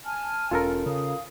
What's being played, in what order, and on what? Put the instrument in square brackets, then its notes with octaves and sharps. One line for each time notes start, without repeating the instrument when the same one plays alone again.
[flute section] G#5 A5 F6
[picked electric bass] E1 C#4 [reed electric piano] F4 A4 A#4
[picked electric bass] C#3 [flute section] F5 D#6